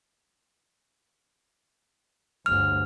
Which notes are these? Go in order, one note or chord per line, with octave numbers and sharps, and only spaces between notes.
G1 D2 F6